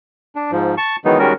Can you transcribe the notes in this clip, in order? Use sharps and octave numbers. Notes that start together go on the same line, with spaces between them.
D4
G#2 F3
A5 C#6
D#3 E3 F#3 G#3 B3 D#4
D#3 G3 G#3 C#4 F#4 A#4